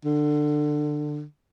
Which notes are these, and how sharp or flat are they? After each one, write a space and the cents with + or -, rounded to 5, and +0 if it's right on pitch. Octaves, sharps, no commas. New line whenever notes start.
D3 +20